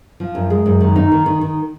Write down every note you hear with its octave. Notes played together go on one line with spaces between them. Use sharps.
F3
F#2
G#3
F#2
D#3
D#4
D#3
D#3
D#3